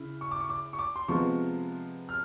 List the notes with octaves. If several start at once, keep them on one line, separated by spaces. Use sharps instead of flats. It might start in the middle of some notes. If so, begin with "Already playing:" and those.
Already playing: C#3 E4
C#6
D6
C#6
D6
C#6
D6
C6
C3 F3 G#3 B3 C#6
F6